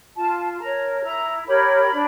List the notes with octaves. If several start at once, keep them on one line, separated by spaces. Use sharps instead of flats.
F4 A5
A#4 C#5 A#5
E4 A#5
G4 A#4 C#5 B5
D4